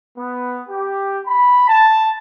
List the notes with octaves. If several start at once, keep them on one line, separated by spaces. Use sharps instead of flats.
B3
G4
B5
A5